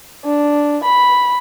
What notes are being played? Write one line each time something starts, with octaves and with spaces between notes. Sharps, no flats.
D4
B5